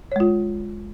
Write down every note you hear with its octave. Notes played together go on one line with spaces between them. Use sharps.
G#3 F4 C#5